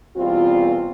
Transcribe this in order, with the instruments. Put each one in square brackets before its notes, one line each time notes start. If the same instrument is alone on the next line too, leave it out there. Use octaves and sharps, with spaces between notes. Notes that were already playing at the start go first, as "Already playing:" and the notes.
[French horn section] E2 B2 G3 C4 F4